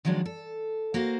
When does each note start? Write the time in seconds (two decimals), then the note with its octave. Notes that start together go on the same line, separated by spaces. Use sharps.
0.05 D#3 F3 F#3 G#3 D4
0.26 A4
0.94 A#3 F#4 C5 F5